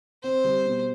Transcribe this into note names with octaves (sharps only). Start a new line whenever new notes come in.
C4 C5
G3
B2